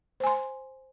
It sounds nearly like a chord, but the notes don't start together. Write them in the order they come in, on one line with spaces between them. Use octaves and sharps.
C5 G#5 C6